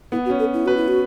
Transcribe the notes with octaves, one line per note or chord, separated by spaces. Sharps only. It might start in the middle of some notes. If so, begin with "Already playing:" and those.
B3 E4
F#4
C#4
A4
E4
F#4 B4
E4
F#4